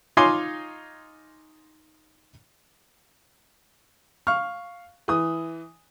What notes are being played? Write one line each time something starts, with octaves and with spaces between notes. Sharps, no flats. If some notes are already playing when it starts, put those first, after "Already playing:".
D#4 F4 C#5 G#5 C6 D6
F5 C#6 F6
E3 D#6